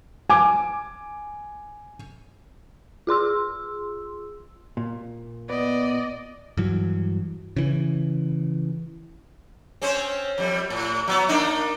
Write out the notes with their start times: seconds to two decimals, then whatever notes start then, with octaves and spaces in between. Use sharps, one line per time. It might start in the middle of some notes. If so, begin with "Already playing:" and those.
0.30 G#5 D6
3.07 F4 G#4 C6 E6
4.77 A#2
5.50 B3 D5 D#5
6.57 G2 E3 F#3
7.56 C#3 E3
9.82 C4 C#4 C5
10.38 F2 G3
10.70 A2
11.08 F#3 B3
11.29 A#3 D4 D#4